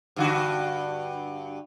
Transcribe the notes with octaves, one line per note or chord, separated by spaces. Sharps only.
G2 D3 F#4